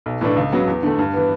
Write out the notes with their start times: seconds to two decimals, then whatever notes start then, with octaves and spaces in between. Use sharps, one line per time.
0.06 B1
0.21 A2 E3 A3 D4
0.37 C#2
0.52 C#3 F#3 B3
0.67 E2
0.83 D3 A3
0.99 G2
1.14 E3 B3